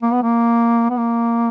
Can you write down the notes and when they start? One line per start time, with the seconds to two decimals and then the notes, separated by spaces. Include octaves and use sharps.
0.03 A#3
0.12 B3
0.23 A#3
0.90 B3
0.97 A#3